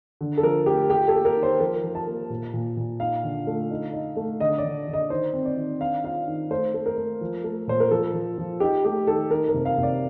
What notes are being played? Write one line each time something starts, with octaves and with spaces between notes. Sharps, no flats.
D3
A4
F3 A#4
A3 G4
F4 G4
A4
A#3
A#4
D#3
C5
F3 A#4
F3
A5
A#3
A#2
A#2
A#2
D#4 F5
D3
A3
D#4
D#4
A3
D3 D#5
D5
D3
D3
D#5
D#3 C5
C4
D5
D#3
D4 F5
F4 F5
D#3
A3 C5
A3
A#4
A3
F3
A3
A#2 C5
A#4
F3 A4
F3
F3
D#4 G4
A3 G4
D#3 A4
D#3 A#4
A#4
C3
F5
C3 D5